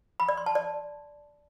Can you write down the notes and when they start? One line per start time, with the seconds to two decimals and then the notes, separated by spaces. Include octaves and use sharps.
0.20 B5
0.29 D5
0.37 C6
0.46 A5
0.55 D5